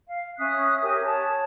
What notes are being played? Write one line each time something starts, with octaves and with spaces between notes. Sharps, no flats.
F5
C#4 E5 D#6 F#6
G4 A#4 C#5 G#5
C#5 A5